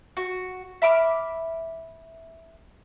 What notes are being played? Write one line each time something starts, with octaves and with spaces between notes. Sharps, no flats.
F#4
E5 B5 D6 F6